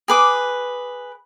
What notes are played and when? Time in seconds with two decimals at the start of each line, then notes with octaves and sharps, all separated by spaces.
0.08 G#4 B4 D6